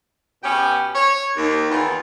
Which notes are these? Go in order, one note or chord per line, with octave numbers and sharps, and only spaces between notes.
B2 B3 C#4 G4
C#5
D#2
E2 D#3 E3 F4